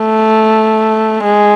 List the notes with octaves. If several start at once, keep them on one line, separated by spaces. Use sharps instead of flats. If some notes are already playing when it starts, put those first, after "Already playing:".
Already playing: A3
G#3